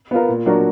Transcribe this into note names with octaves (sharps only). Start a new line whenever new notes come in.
B3 F4 A#4
A#2
F#3 D4 F#4 A#4